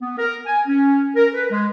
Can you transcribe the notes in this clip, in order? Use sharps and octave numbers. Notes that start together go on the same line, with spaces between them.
B3
A#4
G#5
C#4
A#4
B4
G#3